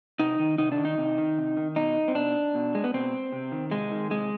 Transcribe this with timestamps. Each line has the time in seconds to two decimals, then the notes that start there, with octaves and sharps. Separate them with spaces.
0.19 C3 D#4
0.39 D#3
0.58 C3 D#4
0.72 D4
0.78 D#3
0.85 D#4
0.98 C3
1.18 D#3
1.38 C3
1.57 D#3
1.76 B2 D#4
2.08 C4
2.15 B2 D4
2.55 B2
2.75 G#3
2.84 B3
2.94 B2 C4
3.33 C3
3.52 D#3
3.71 C3 G#3
3.91 D#3
4.11 C3 G#3